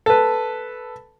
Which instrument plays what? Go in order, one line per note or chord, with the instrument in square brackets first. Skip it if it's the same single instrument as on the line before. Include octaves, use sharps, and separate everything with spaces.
[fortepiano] A4 B4